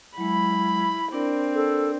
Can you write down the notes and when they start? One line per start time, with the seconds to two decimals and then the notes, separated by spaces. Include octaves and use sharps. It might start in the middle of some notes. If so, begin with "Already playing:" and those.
0.18 F#3 G#3 E4 B5
1.12 C4 D4 A#4 D5
1.55 A4